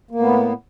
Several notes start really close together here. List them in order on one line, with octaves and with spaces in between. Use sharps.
A#3 A2 B3